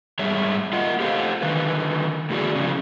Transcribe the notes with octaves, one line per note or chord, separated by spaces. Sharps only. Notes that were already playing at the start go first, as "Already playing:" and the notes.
G#2 G3 G#4 C#5 E5
F4 D#5 F#5
G4 A4 C5 F5
D3 D#3 B4
A2 D3 E4 F#4 G#4 D5
C#3 F3